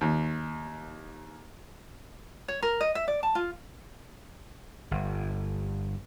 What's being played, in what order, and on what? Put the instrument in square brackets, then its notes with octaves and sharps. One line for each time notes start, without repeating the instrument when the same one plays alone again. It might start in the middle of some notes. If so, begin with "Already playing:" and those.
[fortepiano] D#2
[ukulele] C#5
A#4
D#5
E5
D5
A5
F4
[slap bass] G1